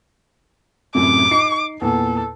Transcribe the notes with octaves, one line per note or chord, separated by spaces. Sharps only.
F#2 A2 C3 D6
D#4 C7
E2 A#2 A4